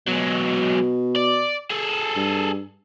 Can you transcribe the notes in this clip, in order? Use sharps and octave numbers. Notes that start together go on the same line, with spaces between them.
B2 F#3 G#3
D5
G#4 A4
G2